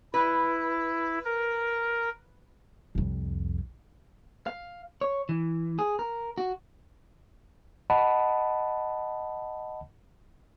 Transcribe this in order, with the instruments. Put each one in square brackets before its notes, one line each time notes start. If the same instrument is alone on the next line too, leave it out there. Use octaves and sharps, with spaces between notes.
[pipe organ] E4 [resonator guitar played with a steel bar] B4
[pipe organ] A#4
[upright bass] C2 F2
[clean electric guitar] F5
C#5
E3
G#4
A#4
F#4
[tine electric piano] D#5 F#5 A5 B5